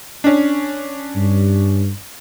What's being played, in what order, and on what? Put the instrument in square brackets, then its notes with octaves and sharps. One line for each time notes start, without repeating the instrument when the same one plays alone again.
[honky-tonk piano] C#4 D4
[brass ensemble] G2